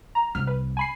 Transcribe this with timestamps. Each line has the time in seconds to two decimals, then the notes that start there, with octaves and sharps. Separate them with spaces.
0.15 A#5
0.35 C2 C4 F6
0.47 B4
0.77 G#5 B5 C7